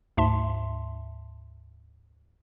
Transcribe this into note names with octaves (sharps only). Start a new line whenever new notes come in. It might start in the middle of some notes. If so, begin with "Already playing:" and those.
D2 G#2 E5 A5 C6